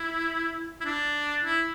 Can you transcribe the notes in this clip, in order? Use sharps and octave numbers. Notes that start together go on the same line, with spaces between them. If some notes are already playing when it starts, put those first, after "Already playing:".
Already playing: E4
E4
D4
E4